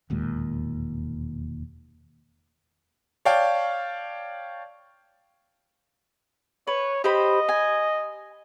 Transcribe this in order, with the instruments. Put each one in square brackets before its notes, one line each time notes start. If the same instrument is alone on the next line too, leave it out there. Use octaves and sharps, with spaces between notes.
[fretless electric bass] E1 D#2 A#2 G#3
[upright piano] C#5 D5 F5 G5 A5
[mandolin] B4 [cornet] C#5
[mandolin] G4 C5 B5 [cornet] D#5
[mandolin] G#5